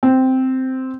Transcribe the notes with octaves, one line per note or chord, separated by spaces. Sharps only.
C4